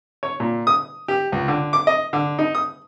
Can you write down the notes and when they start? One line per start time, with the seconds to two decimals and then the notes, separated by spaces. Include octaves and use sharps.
0.23 C#5
0.40 A#2
0.67 D#6
1.08 G4
1.32 C#2
1.48 D3
1.73 D6
1.87 D#5
2.13 D3
2.39 D#4
2.55 D#6